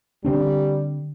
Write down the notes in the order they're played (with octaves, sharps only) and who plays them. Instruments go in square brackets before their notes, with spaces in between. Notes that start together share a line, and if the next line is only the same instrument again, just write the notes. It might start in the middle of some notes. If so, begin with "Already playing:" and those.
[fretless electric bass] D3 C4 D4 [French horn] G3